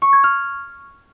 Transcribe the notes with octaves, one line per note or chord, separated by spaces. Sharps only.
C#6
G#6
F6